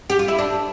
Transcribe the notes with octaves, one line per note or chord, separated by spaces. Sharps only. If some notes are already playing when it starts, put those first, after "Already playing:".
G4
F4
E4
D4